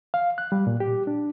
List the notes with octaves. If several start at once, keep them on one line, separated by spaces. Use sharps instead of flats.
F5
F#6
G3
A#2
G4
D4